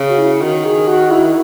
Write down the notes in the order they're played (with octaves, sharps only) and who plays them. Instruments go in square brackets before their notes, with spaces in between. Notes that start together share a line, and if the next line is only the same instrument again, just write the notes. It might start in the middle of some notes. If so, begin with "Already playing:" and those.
Already playing: [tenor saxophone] C#3
[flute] F#4
E4
[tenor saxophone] D#3 [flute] F#4
[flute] G#4
F#4
E4